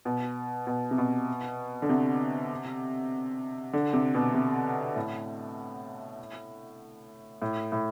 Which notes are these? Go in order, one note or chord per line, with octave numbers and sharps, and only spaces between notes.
B2
B2
C3
B2
D3
C3
D3
C3
B2
C3
A2
A2
A2